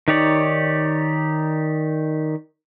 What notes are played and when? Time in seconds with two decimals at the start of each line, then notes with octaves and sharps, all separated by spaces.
0.08 D#3 D#4 G4 C#5 D5